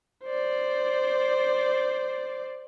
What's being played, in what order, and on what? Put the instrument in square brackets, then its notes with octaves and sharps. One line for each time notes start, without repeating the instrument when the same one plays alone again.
[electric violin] C5 D5